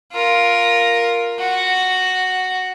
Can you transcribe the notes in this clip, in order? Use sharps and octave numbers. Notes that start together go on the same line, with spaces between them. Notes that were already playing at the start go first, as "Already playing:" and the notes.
F4 A#4
F#4